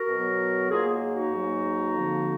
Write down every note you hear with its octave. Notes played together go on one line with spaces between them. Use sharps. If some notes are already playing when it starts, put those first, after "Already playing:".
Already playing: F#4 A#4
B2 F#3 B3
G#2 F#3 A#3 F4 G#4
D#4 F#4
G#2 F#3 A#3
F2 D3 F3 A#3